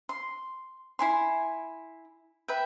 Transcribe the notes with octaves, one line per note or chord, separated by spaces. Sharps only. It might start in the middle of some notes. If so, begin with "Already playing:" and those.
C6
E4 G#5 C6
B4 E5 G5